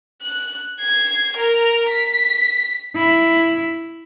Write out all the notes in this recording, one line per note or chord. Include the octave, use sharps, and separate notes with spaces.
F#6
G#6 C7
A#4 A#5
B6
E4